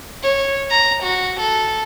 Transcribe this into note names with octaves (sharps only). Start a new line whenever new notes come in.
C#5
A#5
F#4
A4